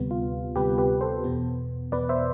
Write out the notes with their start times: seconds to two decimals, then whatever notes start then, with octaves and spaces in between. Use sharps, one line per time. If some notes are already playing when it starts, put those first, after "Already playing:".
Already playing: D2 C3 G3 B3
0.11 F4
0.56 D2 C3 G3 B3 G4 B4
0.78 G4 B4
1.01 A4 C5
1.24 E2 B2 B3
1.92 E2 B2 B3 B4 D5
2.09 C5 E5